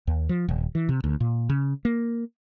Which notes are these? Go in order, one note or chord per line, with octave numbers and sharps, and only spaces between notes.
D#2
F3
D#1
E3
C3
D2
A#2
C#3
A#3